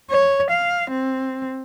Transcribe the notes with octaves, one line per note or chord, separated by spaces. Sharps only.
C#5
F5
C4